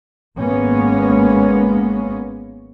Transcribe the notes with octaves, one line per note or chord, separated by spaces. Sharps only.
G#1 G#3 A#3 B3 C#4